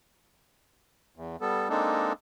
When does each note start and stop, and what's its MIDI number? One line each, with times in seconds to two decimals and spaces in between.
1.16 1.36 40
1.41 1.69 55
1.41 1.69 59
1.41 1.69 69
1.69 2.13 56
1.69 2.13 58
1.69 2.13 60
1.69 2.13 62
1.69 2.13 63
1.69 2.13 69